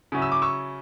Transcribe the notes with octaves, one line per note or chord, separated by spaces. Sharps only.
C#3 F#3 C#4 E4
E6
D6
C#6 E6